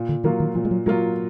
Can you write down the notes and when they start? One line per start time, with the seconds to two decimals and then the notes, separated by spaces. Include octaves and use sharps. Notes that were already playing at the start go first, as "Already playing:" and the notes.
Already playing: A#2
0.09 D3
0.24 D#3 F#3 A#3 F4
0.40 D#3
0.55 A#2 F3
0.65 G#3
0.71 F#3
0.86 F#3 G#3 A#3 F4